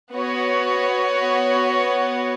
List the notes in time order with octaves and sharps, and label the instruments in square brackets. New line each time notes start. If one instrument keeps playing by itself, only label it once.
[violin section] B3 F#4 C#5